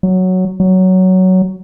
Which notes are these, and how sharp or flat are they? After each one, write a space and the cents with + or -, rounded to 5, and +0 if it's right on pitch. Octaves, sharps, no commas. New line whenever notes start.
F#3 +0
F#3 +10